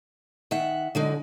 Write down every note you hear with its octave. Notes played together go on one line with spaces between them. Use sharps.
D#3 E5 F#5
D3 F#3 G#3 D#4